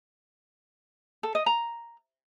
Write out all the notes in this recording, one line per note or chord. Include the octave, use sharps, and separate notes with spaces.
A4
D#5
A#5